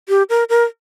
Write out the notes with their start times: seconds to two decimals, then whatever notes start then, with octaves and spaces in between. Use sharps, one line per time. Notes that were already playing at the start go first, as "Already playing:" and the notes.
0.09 G4
0.30 A#4
0.49 A#4